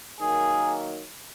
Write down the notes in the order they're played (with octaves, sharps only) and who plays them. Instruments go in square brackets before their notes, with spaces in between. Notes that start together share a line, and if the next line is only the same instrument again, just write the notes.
[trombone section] D#3 F#3 A#3 G#4